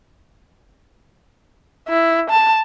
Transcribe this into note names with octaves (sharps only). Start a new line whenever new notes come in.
E4
A5